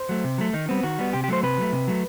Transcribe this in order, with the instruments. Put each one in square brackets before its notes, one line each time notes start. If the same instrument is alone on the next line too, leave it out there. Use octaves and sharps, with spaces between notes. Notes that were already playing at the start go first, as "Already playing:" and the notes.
Already playing: [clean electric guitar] C5
F#3 A3
C3
F#3 A3
D#3 D#4
G3 B3 C4
D#3 F#4
G3 B3
C3 G4
G4
F#3 A3 C5
C3 B4
F#3 A3
C3
F#3 A3